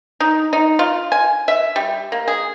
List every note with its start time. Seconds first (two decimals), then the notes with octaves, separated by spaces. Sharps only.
0.20 D#4
0.53 D#4
0.79 F4
1.12 G#5
1.48 E5
1.76 G3
2.12 A#3
2.28 G#4